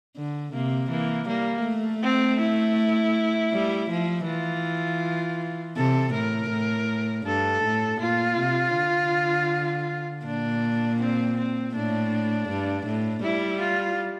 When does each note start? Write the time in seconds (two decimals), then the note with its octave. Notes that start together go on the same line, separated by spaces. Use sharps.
0.16 D3
0.53 C3 A#3
0.90 E3 A#3
1.27 G3 A#3
1.65 A3
2.03 C4
2.40 E4
3.53 G3
3.90 F3
4.27 E3 F4
5.77 C3 A4
6.13 A2 A#4
6.51 A2
7.26 G2 A4
7.64 A2
8.00 A#2 F4
8.39 C3
8.76 D3
10.25 A#2 D4
11.00 C4
11.37 C4
11.75 A2 D4
12.49 G2
12.86 A2
13.24 G3 E4
13.61 F4